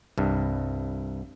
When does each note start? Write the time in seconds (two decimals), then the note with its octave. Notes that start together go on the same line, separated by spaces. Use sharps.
0.18 C2 G2